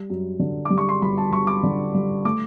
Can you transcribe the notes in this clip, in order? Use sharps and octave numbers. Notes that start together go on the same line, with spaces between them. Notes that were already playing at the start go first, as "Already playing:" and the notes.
Already playing: G3
F#2
D3
G3 D6
C#6
C6
G1 B5
A5
G1 C#6
D6
D3
G3
A3 D6